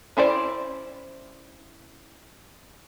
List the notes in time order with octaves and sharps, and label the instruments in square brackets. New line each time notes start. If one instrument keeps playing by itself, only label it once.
[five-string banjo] C#4 E4 C5 D5